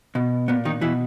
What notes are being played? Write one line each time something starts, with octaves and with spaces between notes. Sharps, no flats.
B2
A#2 B3
D#3 D#4
B2 E3 E4